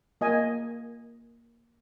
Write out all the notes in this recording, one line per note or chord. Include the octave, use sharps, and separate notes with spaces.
A#3 D#5 G#5